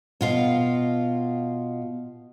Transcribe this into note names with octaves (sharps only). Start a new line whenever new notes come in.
B2 F4 F5